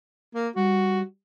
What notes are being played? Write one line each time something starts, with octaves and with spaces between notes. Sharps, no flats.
A#3
G3 F#4